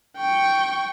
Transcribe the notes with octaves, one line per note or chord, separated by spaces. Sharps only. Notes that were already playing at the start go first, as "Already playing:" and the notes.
G5 C#6